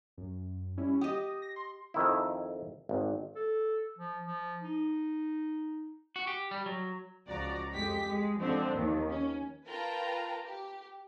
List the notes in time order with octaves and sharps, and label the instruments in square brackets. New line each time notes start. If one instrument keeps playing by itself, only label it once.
[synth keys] F#2
G3 C#4 E4
[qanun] G4 D#5 [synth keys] D#6
[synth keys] A#6
C6
[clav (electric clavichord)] F2 D#3 E4
G#1
[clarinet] A4
F3
F3
D#4
[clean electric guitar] F#4
G4
G3
F#3
[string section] C#2 F3 F#4 D5 A#5
F2 G#3 G4 B6
G#3
D3 F3 G#3 C4 D4
D#2 D#3 F3
C#4
[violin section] F4 A#4 B4 G5 A5 A#5
G4